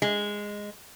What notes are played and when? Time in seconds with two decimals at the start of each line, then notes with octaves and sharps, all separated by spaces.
0.02 G#3